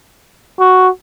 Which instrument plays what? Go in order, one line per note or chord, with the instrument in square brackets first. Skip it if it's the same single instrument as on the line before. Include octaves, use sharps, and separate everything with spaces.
[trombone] F#4